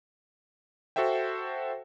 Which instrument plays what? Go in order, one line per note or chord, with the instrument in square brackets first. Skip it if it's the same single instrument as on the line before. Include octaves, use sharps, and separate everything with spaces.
[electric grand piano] F#4 A4 C5 E5 G5